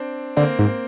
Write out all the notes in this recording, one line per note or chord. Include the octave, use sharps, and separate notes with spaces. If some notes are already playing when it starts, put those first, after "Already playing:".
Already playing: C4 D4
D3 A#3 C4
G#2